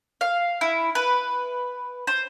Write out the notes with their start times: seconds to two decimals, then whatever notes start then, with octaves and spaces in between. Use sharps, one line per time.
0.21 F5
0.61 E4
0.95 B4
2.07 C5